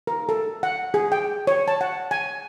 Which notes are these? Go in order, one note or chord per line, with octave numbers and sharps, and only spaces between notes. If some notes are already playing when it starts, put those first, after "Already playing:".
A#4
A4
F#5
G#4
G5
C#5
A5
F#5
G#5